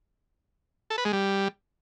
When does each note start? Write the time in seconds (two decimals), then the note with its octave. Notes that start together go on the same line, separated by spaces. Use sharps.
0.90 A4
0.98 B4
1.05 G#3
1.13 G3